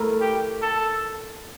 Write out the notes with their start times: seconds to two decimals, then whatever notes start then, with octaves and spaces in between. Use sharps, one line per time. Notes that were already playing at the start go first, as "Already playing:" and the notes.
Already playing: A3 E4 A#4
0.21 G4
0.62 A4